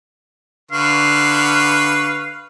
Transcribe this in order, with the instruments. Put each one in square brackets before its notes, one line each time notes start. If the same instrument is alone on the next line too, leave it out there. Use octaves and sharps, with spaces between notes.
[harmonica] D3 B4 C#6 [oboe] F5